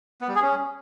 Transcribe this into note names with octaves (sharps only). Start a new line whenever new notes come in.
B3
G3
G#4
C#4